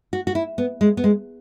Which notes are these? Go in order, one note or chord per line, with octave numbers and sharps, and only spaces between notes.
F#4
F#4
E4
B3
G#3
B3
G#3